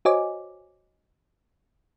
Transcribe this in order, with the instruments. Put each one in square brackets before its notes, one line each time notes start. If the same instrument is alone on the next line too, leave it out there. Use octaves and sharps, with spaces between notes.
[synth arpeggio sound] F#4 C5 C#5 D#5 G#5 D6